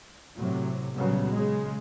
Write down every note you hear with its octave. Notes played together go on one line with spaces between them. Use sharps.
A2 C3 F#3
A#2 C#3 F#3 G3 B3
C#3 G#3